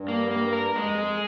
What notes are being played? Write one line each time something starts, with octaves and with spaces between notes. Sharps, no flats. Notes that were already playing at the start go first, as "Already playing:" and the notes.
Already playing: G2
A#3
A#3
A#4
F2 G#3
F2
G#4